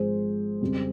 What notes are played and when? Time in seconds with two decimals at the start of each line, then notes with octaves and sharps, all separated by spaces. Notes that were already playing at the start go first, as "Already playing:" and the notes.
Already playing: G#1 G#2 F3 G#3 G#4 C5
0.61 F2 C#3 G3